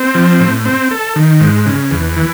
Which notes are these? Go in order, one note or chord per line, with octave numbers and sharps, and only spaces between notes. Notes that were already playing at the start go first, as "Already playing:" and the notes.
Already playing: C4
F3
A2
C4
A4
D#3
G#2
C#3
E2
E3